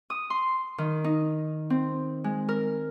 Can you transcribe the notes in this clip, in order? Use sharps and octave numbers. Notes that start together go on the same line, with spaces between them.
D#6
C6
D#3
D#4
C4
G#3
A#4